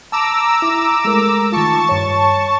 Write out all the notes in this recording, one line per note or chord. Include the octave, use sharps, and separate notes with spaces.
A5 A#5 D6 E6
E4
G#3 A3 A#4
D#3 F4 A5 C#6
G2 C#5